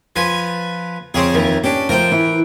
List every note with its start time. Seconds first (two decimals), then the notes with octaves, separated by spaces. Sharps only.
0.16 F3 B4 G#5
1.14 F2 C4 C#4 G#4
1.34 D#2 E3
1.64 C#4 D4 G4
1.89 F3 A3 A#4 C5 G5
2.12 E3